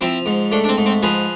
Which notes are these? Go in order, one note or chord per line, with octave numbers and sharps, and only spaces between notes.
F3 C4 E4
G#2
A3 D4
D4
C4
G#2
C4
F3 G#4 B4